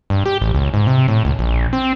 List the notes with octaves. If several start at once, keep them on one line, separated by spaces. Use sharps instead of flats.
G2
G4
A1
C#2
G#2
C3
A2
C#2
A#1
C4